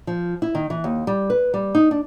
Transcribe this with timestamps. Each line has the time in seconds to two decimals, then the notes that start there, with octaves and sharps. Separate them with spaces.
0.07 F3
0.42 E4
0.55 D#3
0.70 E3
0.84 D#2
1.07 G3
1.30 B4
1.54 G3
1.75 D#4
1.91 D4